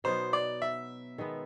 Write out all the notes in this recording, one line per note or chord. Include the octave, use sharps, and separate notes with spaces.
B2 F#3 B3 D#4 C5
D5
E5
D#3 G#3 B3